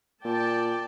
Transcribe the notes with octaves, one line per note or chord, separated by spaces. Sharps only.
A#2 D5 G5 A5